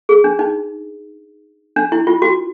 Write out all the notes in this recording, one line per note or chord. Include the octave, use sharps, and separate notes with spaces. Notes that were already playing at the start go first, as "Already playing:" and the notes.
G#4
D4
D#4
D4
E4
F4
F#4